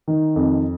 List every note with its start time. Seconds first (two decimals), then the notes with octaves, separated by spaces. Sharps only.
0.08 D#3
0.36 F2